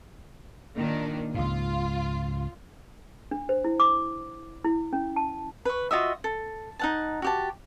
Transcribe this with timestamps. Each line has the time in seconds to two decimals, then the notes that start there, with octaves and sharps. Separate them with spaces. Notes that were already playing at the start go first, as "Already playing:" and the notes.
0.77 A#2 D#3 D4
1.34 C#2 G#2 F4
3.31 D4
3.49 C5
3.64 E4
3.80 D6
4.65 E4
4.93 C#4
5.16 A5
5.65 B4 C#6
5.91 F4 F#4 D#5 E5
6.24 A4
6.79 D#4 F#5 A5
7.22 F#4 G4 A5